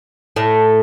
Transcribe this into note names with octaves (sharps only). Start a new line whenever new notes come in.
A2